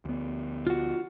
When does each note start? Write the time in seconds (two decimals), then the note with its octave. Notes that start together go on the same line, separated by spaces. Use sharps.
0.05 D2 B3
0.67 F4 F#4